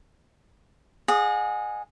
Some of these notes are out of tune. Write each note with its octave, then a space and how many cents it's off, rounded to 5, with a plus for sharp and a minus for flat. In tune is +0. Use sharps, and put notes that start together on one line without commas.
G#4 +0 D#5 -35 F#5 -35